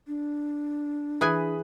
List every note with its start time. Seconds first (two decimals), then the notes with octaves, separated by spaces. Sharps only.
0.07 D4
1.21 E3 G#4 G#5 B5 D#6 F#6